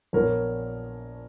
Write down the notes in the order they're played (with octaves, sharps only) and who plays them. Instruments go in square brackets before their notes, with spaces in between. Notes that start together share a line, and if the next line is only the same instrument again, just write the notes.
[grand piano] A#1 A#2 F3 B3 A#4 C#5